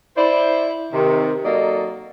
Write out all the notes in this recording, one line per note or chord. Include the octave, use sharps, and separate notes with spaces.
E4 C5 D5
C3 D#3
F#3 A#3 D#4 A4 D5 D#5